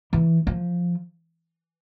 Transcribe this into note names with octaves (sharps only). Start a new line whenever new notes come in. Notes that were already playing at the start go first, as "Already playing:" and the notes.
E3
F3